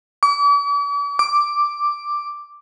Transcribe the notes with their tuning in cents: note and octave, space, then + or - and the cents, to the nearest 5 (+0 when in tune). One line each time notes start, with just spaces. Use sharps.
D6 -45
D6 +0